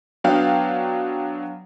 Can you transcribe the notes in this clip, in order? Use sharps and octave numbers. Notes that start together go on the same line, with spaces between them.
F#3 B3 D4 F5 G5